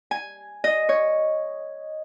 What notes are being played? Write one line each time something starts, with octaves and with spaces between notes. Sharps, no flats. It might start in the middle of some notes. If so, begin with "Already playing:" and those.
G#5
D#5
C#5